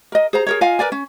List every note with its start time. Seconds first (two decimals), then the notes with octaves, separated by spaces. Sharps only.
0.12 A#4 D#5
0.33 G#4 C5 A#5
0.46 G#4 A#4 C#5
0.61 F4 D#5 F5 G#5
0.79 A#4 B4 D5 G#5
0.92 C#4